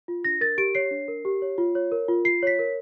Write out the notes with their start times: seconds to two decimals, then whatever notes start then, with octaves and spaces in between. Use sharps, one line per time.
0.08 F4
0.24 D4 A#6
0.41 A#4 A6
0.58 G4 D7
0.75 C#5 C7
0.91 D4
1.08 A#4
1.25 G4
1.42 C#5
1.58 F4
1.75 C#5
1.92 A#4
2.08 F4
2.25 F4 C7
2.43 C#5 B6
2.59 A#4